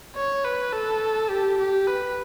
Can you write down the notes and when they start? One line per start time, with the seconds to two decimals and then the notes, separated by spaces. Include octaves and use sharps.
0.16 C#5
0.45 B4
0.73 A4
1.30 G4
1.58 G4
1.87 B4